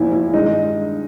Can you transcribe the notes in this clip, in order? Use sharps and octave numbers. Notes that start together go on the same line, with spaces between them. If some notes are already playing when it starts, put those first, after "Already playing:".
Already playing: E2 C#3 F3 A#3 D#4 E4
E4
G2 D#3 G#3 D#4